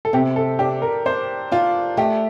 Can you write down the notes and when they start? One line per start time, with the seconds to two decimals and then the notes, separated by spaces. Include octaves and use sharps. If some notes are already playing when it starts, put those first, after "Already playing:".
0.05 A4
0.13 C3 G4
0.36 A4
0.59 D4 G4
0.82 A#4
1.06 D4 C5
1.52 D4 F4
1.97 A3 G4